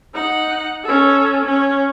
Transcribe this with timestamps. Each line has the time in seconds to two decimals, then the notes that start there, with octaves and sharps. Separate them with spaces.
0.15 D#4 F#5
0.84 C#4 A4
1.45 C#4